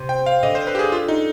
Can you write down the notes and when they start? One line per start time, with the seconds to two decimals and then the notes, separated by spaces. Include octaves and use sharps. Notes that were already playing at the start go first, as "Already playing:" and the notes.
Already playing: C3
0.09 G5
0.26 F5
0.43 D3 D#5
0.55 C5
0.67 B4
0.75 G4
0.79 G#4
0.92 F4
1.08 D#4